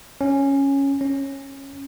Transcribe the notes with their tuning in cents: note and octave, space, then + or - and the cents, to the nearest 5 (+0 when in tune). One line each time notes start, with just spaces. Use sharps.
C#4 -5
C#4 -15